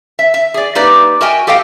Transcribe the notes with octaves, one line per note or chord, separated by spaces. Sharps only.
E5
E5
G#4 D5
A#3 D#4 G4 B4 D5
F#4 A#4 D#5 E5 G5 G#5
G4 A4 D#5 F5 G5